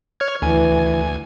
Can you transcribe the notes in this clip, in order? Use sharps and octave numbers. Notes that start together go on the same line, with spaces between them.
C#5 F6 G#6
D2 E3 G#5